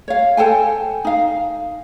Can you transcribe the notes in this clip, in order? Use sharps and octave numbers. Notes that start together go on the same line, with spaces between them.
C#5 F5
A4 C5 G5 G#5
D#4 F5